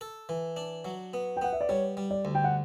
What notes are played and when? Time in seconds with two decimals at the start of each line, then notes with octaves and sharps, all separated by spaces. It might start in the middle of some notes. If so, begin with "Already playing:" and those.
0.01 A4
0.29 E3
0.57 D4
0.85 F#3
1.14 B3
1.37 G5
1.42 B3 F#5
1.53 E5
1.61 D5
1.69 G3 C#5
1.97 G3
2.11 D5
2.25 D2
2.35 G5
2.44 F#5